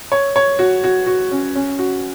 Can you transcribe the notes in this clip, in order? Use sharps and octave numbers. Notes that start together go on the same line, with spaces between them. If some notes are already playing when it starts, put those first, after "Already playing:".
C#5
C#5
F#4
F#4
F#4
C#4
C#4
F#4